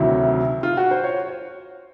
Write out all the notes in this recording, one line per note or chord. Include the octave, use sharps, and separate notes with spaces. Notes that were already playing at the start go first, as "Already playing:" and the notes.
Already playing: D2 C3 D#3 F#3 E4
F4
F#4
C5
C#5